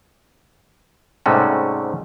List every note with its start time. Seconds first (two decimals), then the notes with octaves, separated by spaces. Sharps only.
1.26 G#2 C3 G3 A3 C#4 F#4